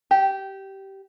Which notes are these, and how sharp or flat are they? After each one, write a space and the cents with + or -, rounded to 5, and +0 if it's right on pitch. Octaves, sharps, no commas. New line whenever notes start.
G4 -15